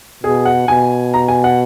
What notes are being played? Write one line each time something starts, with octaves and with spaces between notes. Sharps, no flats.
B2 G#4
F#5
B2 G#5
A#5
G#5
F#5